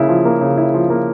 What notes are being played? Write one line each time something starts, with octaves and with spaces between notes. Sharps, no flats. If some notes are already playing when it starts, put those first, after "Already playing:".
Already playing: C#3 A#3 E4
F3
A#3
C#3
E4
F3
A#3